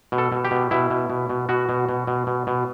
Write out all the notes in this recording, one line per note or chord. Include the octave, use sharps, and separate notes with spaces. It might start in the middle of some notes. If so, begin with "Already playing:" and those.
B2
A4
B2
G4
B2
B2 E4
B2
B2
B2
B2 F#4
B2
B2
B2
B2
B2